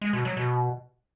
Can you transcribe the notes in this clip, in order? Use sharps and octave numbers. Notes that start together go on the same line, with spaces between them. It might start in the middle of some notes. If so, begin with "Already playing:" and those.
G#3
B2
F#3
B2